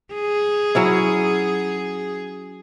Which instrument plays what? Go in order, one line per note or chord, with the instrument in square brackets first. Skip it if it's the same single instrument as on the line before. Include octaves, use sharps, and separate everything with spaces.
[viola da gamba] G#4
[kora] F#3 C#4 E4